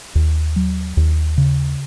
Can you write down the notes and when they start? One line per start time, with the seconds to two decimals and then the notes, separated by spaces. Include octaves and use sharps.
0.15 D#2
0.56 F#3
0.97 D#2
1.38 C#3